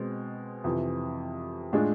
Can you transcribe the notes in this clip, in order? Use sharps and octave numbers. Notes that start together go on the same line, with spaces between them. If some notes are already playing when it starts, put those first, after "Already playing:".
Already playing: B2 G#3 C4
F2 C3 E3
A2 G#3 D4 F4 G#4